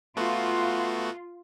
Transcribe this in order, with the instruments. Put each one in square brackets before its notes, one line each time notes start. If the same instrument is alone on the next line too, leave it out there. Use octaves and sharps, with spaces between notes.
[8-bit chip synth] A3 B3 F#4 [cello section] F4